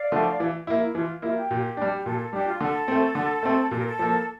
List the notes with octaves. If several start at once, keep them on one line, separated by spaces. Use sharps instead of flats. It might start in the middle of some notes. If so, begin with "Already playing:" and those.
Already playing: D5 F5
D3 F3 A3
E3
A#3 E4
E4
E3 F4
A#3 E4 F4
G4
A#2
G3 D4
G4
A#2 A4
A4
G3 D4 G4
F4
D3 A4
A3 C4
D3
A3 C4
A#2 A4
A#4
A4
F3 A#3